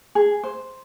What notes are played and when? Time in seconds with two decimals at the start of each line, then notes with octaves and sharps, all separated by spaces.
0.15 G#4
0.44 C5